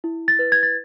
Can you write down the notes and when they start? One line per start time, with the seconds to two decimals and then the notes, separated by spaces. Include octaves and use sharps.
0.04 E4
0.28 A6
0.39 B4
0.52 G#6
0.63 A6